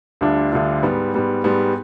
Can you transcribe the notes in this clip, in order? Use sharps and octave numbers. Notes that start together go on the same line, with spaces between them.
D2 D3 G3 D4 F4
D2 D3 G3 D4 F4
G#2 G3 B3
G#2 G3 B3
G#2 G3 B3